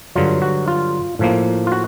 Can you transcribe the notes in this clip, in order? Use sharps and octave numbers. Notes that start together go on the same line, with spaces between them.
G2 D3 F#3 F4
F#4
F4
A2 F3 A#3
F4
F#4